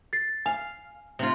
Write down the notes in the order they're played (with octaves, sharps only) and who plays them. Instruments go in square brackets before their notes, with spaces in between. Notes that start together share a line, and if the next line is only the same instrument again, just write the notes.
[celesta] A6 C7
[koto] F5 [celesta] G#5
[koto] C3 F4